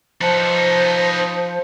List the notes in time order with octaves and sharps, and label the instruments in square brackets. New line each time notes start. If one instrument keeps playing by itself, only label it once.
[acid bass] F3 [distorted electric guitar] D#4 B4 [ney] C5 [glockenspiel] A5 C#7